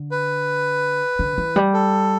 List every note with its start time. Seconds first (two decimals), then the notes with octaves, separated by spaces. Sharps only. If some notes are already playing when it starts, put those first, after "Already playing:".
Already playing: D3
0.11 B4
1.19 D3
1.38 E3
1.56 G3
1.74 A4